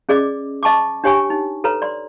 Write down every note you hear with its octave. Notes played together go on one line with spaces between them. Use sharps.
C#4 G#4 D5 D#5 D6
D#5 A5 C#6 D6
D4 G4 C#5 G5 G#5 C#6
D#4
A4 B4 C#5 A#5
D5 C6